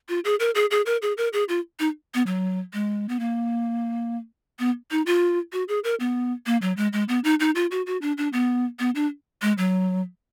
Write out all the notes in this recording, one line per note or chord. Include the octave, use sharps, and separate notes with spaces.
F4
G#4
A#4
G#4
G#4
A#4
G#4
A#4
G#4
F4
D#4
B3
F#3
G#3
B3
A#3
B3
D#4
F4
F#4
G#4
A#4
B3
A#3
F#3
G#3
G#3
B3
D#4
D#4
F4
F#4
F#4
D4
D4
B3
B3
D4
G#3
F#3